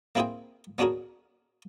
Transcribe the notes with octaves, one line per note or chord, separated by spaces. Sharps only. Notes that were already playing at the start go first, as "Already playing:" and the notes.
A#3 C4 E4 G#4 C5 G5
B3 C#4 D4 F#4 G#4 A#4